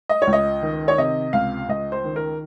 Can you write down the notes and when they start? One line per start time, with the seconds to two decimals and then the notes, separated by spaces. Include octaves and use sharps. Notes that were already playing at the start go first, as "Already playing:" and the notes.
0.09 D#5
0.22 C#5
0.27 C#2
0.33 D#5
0.62 D#3
0.88 C#5
0.98 C3 D#5
1.33 C#2 F5
1.69 C#2 D#5
1.92 C5
2.04 D#3
2.16 A#4